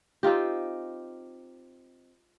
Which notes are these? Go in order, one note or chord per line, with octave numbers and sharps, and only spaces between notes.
C4 D#4 F4 G4